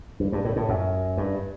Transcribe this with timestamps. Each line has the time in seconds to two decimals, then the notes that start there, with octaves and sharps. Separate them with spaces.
0.20 G2
0.32 G2
0.45 A2
0.56 A2
0.69 F#2
1.17 G2